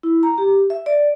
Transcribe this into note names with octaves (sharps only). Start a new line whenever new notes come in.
E4
A#5
G4
E5
D5